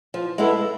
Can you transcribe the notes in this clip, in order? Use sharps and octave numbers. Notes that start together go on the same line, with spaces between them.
F3
G#3 B3 E4 A4